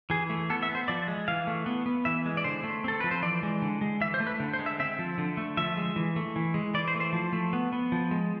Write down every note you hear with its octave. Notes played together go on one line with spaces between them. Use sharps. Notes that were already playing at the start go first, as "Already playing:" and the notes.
E3 G#4
A3
B3 A4
E5
B3
C5
F3 D5
G#3
E3 F5
A3
B3
B3
E3 E5
G#3
D5
D3 C5
A3
C4 A4
F3 B4
C5
E3 D5
G#3
D3
G#3
E3 E5
C5
A3
B4
D3
C5
G#3
E5
C4 E5
F3
D3
A3
F3 E5
G#3
E3
A3
E3
G#3
E3 D5
C5
A3
C5
F3
A3
B3
B3
F3
G#3